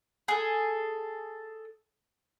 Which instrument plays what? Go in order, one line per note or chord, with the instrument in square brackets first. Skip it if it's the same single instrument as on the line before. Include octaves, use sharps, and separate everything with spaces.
[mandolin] G#4 A4